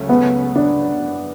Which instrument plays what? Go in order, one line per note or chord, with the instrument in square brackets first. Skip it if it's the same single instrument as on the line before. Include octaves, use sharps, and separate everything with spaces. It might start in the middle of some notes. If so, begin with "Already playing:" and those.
Already playing: [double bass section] C#2 C#3 F#3 A3 C#4
[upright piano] B3
D4
[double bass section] F#2 C#3 E3